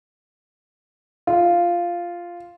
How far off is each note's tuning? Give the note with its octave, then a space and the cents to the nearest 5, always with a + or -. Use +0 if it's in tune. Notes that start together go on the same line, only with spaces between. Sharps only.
F4 -5